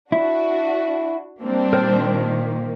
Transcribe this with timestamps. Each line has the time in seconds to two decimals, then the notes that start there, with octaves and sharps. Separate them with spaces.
0.12 D4 E4 F#4
1.43 G3 A#3 C4 D4
1.73 A#2 D#3 A#3 A#4 C5 G5